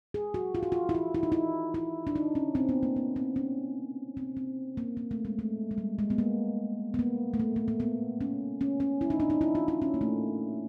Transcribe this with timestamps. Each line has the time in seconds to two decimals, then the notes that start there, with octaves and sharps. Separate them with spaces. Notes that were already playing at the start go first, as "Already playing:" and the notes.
0.14 G#4
0.34 F#4
0.55 F4
0.63 F#4
0.72 F4
0.89 E4
0.95 F4
1.14 E4
1.23 D#4
1.32 E4
1.74 E4
2.07 D4
2.15 D#4
2.35 C#4
2.55 C4
2.69 B3
2.83 A#3
2.96 B3
3.16 C4
3.36 C#4
4.17 C4
4.37 C4
4.77 A#3
4.97 A#3
5.11 A3
5.25 G#3
5.39 A3
5.71 G#3
5.78 G3
5.99 G#3
6.10 B3
6.18 A#3
6.94 B3
6.99 A#3
7.34 A3
7.39 A#3
7.56 A3
7.68 A#3
7.80 B3
8.21 C#4
8.61 C#4
8.80 C#4
9.01 E4
9.10 D#4
9.20 D4
9.30 D#4
9.41 E4
9.55 F4
9.68 E4
9.82 C#4
9.94 A#3
10.01 A3